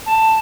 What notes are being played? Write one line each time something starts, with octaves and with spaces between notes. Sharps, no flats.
A5